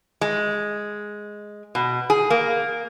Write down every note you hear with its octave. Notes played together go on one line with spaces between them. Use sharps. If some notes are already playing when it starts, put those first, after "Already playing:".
G#3
B2
G#4
A#3